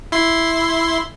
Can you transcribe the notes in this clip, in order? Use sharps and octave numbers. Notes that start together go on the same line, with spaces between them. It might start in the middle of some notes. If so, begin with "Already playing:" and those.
E4 C6